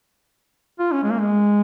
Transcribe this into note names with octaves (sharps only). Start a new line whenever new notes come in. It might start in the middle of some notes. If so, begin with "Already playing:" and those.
F4
C#4
G#3
A#3
G#3